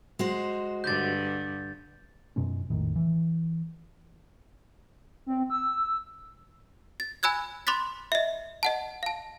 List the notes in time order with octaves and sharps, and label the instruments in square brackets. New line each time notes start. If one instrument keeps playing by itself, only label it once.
[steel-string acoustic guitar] G#3 F#4 C5
[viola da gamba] G2 D3 [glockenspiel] G6 A6
[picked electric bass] F#2 B2 G#3 C#4
A#1 F2 A2 D#3
E3
[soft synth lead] C4
E6
[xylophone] A6
G#5 B5 E6 F#6 G#6
B5 C6 D6 F#6 A6 B6
D#5 E5
D#5 F#5 A5
F5 A5